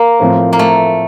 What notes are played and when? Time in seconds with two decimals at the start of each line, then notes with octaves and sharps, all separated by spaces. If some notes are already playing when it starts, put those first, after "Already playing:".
Already playing: A#3
0.20 A2 F3 C4
0.53 A#3
0.59 A3